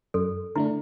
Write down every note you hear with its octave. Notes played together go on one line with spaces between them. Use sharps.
F#2 A4
D3 A3 D4 E4